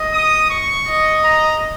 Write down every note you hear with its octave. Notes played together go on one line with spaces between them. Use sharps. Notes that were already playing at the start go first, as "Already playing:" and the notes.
Already playing: D#5
D#6
C#6
D#5
A#5